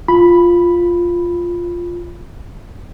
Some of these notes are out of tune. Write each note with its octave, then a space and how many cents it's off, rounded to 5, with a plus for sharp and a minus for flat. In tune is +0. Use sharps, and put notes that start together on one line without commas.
F4 +0 B5 +0